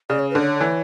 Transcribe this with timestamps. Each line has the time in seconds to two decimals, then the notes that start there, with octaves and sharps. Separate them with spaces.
0.09 C#3 D5
0.19 C#5
0.30 B4
0.35 D3 C#5
0.61 E3